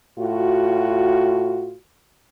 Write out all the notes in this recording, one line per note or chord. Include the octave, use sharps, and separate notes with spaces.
A2 F4 F#4